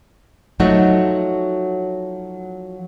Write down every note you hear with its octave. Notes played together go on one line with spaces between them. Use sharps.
F3 F#3 A3 D#4 F#4